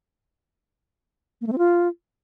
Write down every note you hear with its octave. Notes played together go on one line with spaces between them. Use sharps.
A#3
A3
C4
F4